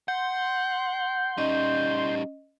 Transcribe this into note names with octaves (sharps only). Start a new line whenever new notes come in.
F#5 C6 G6
G3 C#4 D#4 D#5